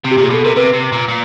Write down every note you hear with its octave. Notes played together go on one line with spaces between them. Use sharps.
C3
G4
A#2 G#4
B2 A4
C3 A#4
C3 B4
C3
A#2
A#2